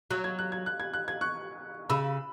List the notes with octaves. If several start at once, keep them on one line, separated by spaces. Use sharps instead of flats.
F#3 F#6
G#6
F#6
G#6
F#6
G#6
F#6
G#6
C#6 F#6
C#3 B5 E6